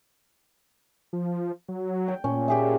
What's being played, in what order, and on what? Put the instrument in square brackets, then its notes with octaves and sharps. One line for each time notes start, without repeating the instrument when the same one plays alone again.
[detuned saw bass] F3
F#3
[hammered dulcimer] G5
[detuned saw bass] A#2 [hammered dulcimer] C#4
[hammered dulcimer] G4 G#4 E5